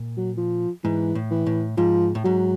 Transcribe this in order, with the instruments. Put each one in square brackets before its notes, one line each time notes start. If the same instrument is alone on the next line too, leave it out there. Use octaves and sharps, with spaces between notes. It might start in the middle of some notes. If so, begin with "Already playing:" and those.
Already playing: [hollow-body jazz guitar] A#2
[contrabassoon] F#3
F3
[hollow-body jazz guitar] G#2 [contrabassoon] E3
[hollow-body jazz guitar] A2
[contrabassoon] E3
[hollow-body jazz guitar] A2
[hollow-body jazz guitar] G#2 [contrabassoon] F3
[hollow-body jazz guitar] A2
[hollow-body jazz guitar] G#2 [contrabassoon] F#3